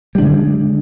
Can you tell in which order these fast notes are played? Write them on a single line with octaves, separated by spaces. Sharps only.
G3 D4 D3 G#3